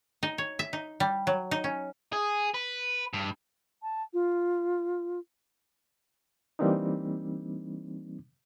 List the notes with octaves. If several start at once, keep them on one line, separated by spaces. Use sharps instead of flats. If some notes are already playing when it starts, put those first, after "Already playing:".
D#4
C#5
E5
D#4
G3
F#3
D#4
C#4
G#4
B4
G2
A5
F4
E3 G3 A#3 C4 D4 D#4